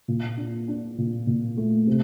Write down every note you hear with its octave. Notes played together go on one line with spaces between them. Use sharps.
A#2
D4
D4
A#2
A#2
A3
C3